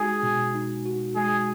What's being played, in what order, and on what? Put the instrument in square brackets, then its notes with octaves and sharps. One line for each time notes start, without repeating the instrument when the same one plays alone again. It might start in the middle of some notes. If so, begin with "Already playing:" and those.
Already playing: [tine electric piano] G#3 D#4 F#4 [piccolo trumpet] G#4
[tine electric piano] B2
D#4
F#4
[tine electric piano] G#3 [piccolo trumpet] G#4